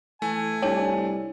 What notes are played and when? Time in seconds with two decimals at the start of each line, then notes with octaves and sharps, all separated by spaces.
0.22 E3 A3 G#5
0.62 C2 D4 C#5 A5